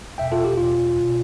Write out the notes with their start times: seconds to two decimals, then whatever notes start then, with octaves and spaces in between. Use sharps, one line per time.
0.18 E2 B2 E5 G5
0.32 F4 A4
0.45 G4
0.57 E2 B2 F4
0.97 C2 B2